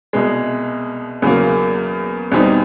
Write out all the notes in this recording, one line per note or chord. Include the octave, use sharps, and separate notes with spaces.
C2 B2 G#3
E2 C#3 F#3 A#3
E2 B2 G3 C4 D#4